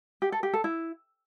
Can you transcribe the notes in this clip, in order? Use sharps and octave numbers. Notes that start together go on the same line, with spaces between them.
G4
A4
G4
A4
E4